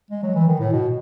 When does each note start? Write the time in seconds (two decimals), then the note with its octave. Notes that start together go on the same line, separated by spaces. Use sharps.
0.11 G#3
0.23 F#3
0.35 E3
0.48 D#3
0.60 A2
0.73 B2